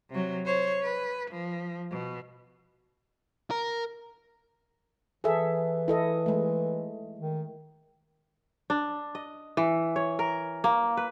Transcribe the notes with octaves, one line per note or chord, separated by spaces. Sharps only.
C3 F#3
C5 C#5
B4
F3
B2
A#4
E3 G#4 A4 E5
E4 A4 D#5
G#3 A3
D#3
D4
D#5
E3
C#5
A#4
A#3
B4